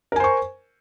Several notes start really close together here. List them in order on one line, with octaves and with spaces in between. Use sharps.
A#4 G#5 C5 C#6